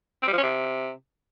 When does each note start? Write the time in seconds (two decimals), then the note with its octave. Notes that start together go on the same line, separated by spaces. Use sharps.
0.22 C4
0.28 G3
0.33 F3
0.38 C#4
0.43 C3